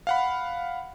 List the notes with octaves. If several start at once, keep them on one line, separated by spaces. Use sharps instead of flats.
F5 F#5 B5